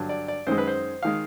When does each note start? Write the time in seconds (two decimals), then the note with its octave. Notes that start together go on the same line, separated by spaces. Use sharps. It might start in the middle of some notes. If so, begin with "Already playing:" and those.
Already playing: G2 D3 F#3
0.09 D5
0.28 D5
0.47 F#2 D#3 G#3 C5
0.58 B4
0.67 C5
1.03 D#3 G#3 F5